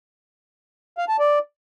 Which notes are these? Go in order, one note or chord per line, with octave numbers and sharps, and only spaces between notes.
F5
A5
D5